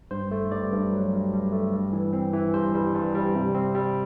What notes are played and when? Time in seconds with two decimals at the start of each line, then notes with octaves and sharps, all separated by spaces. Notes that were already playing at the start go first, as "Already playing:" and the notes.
0.11 G2 C5
0.31 A3
0.52 G2 D5
0.72 G2
0.93 F#3
1.13 G2
1.33 G2
1.52 A3
1.73 G2
1.92 E3
2.13 C4
2.33 E3
2.54 G2 C5
2.74 G3
2.94 G2
3.14 G3
3.35 C3
3.55 C4
3.75 G3